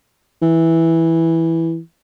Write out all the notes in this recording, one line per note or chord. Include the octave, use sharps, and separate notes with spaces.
E3